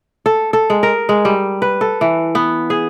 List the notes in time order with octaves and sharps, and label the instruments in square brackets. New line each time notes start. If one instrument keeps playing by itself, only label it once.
[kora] A4
A4
G#3
A#4
G#3
G3
B4
A4
E3
B3
G#4